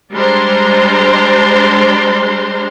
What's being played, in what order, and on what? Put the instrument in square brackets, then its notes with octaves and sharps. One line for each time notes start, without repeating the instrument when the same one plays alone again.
[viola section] G3 G#3 D4 C5 A#5 C6